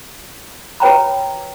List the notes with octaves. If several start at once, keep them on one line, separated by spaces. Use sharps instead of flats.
F#4 B4 C#5 G5 A#5 B5